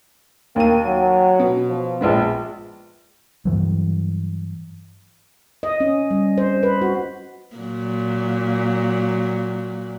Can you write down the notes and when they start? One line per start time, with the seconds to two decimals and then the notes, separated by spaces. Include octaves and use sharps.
0.56 D#2 A#3 D#7
0.86 F#3
1.39 B2
1.69 F3
2.01 A#1 G#3 B3
3.45 G2 E3 F#3
5.63 D#5
5.80 C#4
6.11 G3
6.38 C5
6.63 B4
6.82 F#4
7.56 A#2 F#3